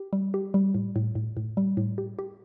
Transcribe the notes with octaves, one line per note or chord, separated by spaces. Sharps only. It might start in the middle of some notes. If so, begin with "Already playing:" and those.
Already playing: G4
G3
G4
G3
A2
A2
A2
A2
G3
A2
G4
G4